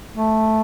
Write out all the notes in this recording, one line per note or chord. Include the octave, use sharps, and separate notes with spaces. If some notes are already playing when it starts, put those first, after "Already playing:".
A3